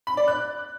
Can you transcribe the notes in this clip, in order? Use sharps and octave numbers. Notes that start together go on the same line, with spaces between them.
B5
D5
F#6